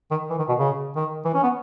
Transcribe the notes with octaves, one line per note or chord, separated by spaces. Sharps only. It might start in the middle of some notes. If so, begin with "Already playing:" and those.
D#3
E3
D#3
B2
C#3
D#3
E3
C#4
B3